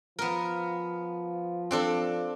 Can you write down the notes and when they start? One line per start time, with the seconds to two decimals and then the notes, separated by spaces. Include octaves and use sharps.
0.19 F3 B3 A#4
1.71 C4 D4 A4